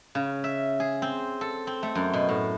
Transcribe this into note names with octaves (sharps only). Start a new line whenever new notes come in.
C#3
E5
G#4
C4
A4
C4
A3
F#2
B2
A2